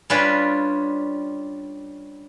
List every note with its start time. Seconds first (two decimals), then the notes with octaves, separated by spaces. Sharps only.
0.10 G3 C#4 D4 F4 B4